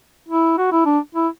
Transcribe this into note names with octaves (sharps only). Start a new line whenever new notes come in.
E4
F#4
E4
D4
E4